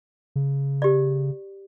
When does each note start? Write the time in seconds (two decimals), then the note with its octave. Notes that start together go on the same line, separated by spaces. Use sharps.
0.36 C#3
0.82 G4 D5